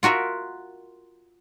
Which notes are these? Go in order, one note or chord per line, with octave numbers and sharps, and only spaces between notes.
F4 F#4 A#4 E5